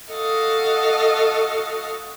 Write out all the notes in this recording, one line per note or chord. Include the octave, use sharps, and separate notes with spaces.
F#4 A4 D#5 F5